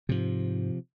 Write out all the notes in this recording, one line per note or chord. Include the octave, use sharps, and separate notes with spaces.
G#2 C3 F3